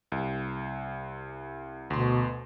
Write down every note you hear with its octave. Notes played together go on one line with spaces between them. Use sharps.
C2
D2 B2 C6